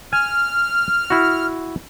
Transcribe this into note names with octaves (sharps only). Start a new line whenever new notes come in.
G#5 F6
E4 F#4